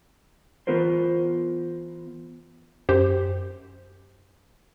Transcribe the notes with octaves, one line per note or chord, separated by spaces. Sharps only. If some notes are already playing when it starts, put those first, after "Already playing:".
E3 B3 F4 A#4 C5
F#2 G4 C5